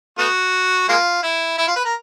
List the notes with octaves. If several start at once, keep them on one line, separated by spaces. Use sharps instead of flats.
A3 B3 F#4
G#3 A#3 F4
E4
E4
F4
B4
A#4